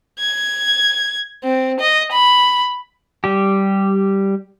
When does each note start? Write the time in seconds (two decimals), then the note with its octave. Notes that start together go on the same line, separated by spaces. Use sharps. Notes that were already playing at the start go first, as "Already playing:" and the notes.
0.20 G#6
1.44 C4
1.80 D#5
2.12 B5
3.24 G3 G4